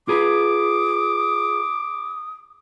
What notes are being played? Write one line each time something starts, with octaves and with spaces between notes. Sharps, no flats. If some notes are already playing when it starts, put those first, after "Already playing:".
F4 G#4 B4 D6 D#6